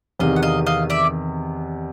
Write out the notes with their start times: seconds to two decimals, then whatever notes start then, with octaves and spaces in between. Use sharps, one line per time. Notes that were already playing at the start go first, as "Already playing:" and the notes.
0.19 E2 C3 D#3 D#5 F5
0.36 F#5
0.43 D#5 F5
0.66 D#5 F5
0.90 D5 E5